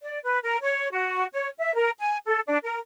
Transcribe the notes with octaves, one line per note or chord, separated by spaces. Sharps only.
D5
B4
A#4
C#5
F#4
C#5
E5
A#4
G#5
A4
D4
A#4